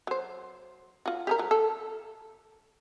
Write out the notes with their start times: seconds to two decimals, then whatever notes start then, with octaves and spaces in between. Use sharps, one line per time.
0.07 F#3 C5
1.06 F4 F#4
1.27 G4 G#4 A#4
1.38 F3 F#3
1.51 A4